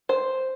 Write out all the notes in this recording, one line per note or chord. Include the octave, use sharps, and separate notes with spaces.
C5